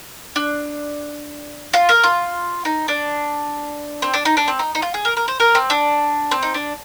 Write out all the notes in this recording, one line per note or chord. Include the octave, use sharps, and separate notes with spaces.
D4
F4
A#4
F4
D#4
D4
C4
D4
D#4
D4
C4
D#4
D#4
F4
G#4
A#4
A#4
C5
A#4
C4
D4
C4
D#4
D4